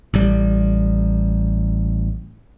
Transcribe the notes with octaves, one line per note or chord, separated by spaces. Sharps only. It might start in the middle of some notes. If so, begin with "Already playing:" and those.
A1 G3